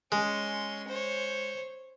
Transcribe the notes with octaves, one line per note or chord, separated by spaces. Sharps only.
G#3 C#4 C6
C5 C#5